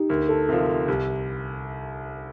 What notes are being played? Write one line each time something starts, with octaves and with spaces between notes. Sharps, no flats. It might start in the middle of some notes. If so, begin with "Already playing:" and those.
Already playing: D#4 G4
D2 A#4
A4
C3 F3 A#4
A4
C2 G4